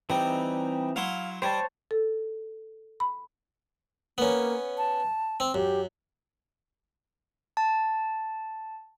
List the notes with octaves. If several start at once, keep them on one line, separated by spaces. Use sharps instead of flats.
E3 G3 C4 D#4
F#3 E4 F5 C6
G3 C5 C#5 A5
A4
B5
A#3 B3 C#4
A5
C4
F#2 G4
A5